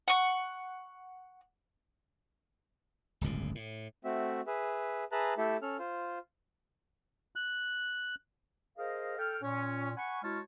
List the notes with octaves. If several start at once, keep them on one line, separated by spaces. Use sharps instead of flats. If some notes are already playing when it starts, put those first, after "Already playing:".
F#5 C#6
D1 G1 C#2 A#2
A2
A3 C4 F#4 E5
G#4 B4 E5
G#4 B4 E5 A5 A#5 F#6
A3 E4 G4 A4 E5
C#4 A4 F6
F4 C5
F#6
G#4 A#4 C5 D#5 F5
A4 G5 F6
A#2 C#4
F#5 G#5 B5 C#6
G#3 E4 F#4 C#5 A5 F6